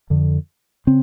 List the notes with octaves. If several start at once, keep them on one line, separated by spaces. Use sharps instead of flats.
F2 D3
C#3 C4